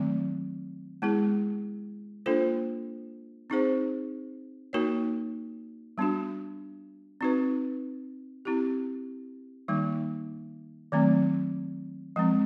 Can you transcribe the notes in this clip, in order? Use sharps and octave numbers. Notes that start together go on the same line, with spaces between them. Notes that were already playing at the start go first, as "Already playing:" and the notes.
Already playing: D#3 F#3 A3 C4
G#3 B3 E4 G#4
A#3 D4 F4 A4 C5
C4 D#4 G#4 C5
A#3 D#4 F#4 A#4 C#5
G3 B3 D4 F#4
C4 D#4 F#4 B4
C4 E4 G4
D#3 G3 A#3 D#4
D#3 F#3 A3 C4
F3 G#3 C4